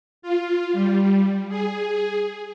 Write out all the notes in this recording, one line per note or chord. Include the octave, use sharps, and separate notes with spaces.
F4
G3
G#4